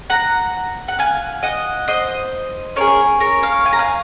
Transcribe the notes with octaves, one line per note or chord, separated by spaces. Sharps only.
F#5 A#5
F#5
F5 G#5
D#5 F#5
C5 D#5
C#4 F4 G#4 A#4 C#5
A#4 C#5
C#5 F5
G#5
A#5
F5 G#5